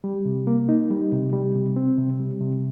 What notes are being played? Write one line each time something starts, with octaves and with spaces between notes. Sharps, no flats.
G3
C3
A#3
D#4
G3
C3
G3
C3
C4
C3
G3
C3